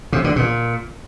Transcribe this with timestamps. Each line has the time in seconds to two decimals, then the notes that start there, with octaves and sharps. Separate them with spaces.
0.13 C3
0.24 D3
0.36 A#2